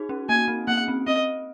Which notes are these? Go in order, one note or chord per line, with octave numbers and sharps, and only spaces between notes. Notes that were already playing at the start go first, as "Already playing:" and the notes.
Already playing: D#4 F#4 G#4
C#4
A#3 G#5
C4
A#3 F#5
C4
C4 D#5